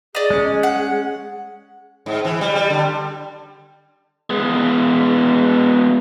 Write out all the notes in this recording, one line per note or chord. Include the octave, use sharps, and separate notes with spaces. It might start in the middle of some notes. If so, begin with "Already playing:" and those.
G#4 D5 D#5
G#3 C#4
F#5
G#2
E3
G3
G3
D3
G#3 B3